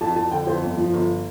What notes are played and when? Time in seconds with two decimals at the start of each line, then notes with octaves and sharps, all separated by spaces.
0.01 F2 A5
0.16 F2 A5
0.31 D3 G5
0.47 F2 C5
0.62 G1
0.77 F3
0.93 G1